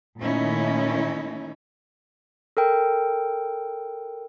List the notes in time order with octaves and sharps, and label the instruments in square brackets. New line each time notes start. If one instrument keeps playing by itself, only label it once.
[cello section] A#2 D#3 A3 C#4 D#4 E4
[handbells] A4 A#4 G5